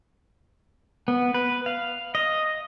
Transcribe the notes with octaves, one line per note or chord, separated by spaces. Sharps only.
B3
B4
F5
D#5